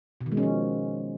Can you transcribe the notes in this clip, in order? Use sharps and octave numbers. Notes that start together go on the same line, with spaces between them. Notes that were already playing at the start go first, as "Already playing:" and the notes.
B2
D#3
G#3
C#4
F3